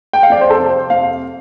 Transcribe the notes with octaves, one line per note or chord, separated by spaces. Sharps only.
G5
F5
F2 D5
C5
A4
C3
C5
F2 F5